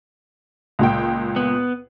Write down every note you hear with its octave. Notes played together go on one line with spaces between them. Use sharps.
C#2 A#2 G5
B3